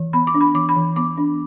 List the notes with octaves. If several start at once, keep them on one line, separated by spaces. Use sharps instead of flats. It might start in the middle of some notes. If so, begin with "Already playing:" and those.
Already playing: E3
B3 B5
D6
D4
B5
E3 D6
B5
E3
B3 D6
D4